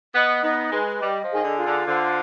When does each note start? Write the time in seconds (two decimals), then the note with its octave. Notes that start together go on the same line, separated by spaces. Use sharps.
0.14 B3 D#5
0.43 B3 D#4
0.71 G#3 B4
1.00 G3 D#5
1.23 F3
1.30 D#3 G#4
1.43 D3
1.58 F4
1.66 D3
1.87 D3 C5